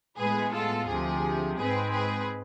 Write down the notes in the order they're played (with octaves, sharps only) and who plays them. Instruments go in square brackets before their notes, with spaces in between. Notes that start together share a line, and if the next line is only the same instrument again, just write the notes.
[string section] A2 G#3 B3 G#4 B4
F4 A4
D2 C3 F3 G#4
G#2 G#3 C4 G#4 B4
G#4 B4